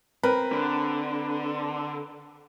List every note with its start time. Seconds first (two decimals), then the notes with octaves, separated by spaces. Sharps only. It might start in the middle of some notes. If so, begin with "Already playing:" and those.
0.23 C4 A#4 B4
0.52 D3